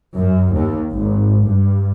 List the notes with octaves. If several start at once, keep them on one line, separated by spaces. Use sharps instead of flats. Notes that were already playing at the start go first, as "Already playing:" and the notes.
F#2
D#2
G#1
G2